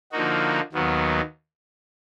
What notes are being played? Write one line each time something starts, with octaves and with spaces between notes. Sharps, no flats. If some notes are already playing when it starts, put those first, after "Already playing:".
D3 F3 A#3 D#4 F#4
D#2 D#3 F#3 B3